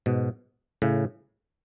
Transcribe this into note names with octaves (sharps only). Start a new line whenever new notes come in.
G#2 B2
A2 C#3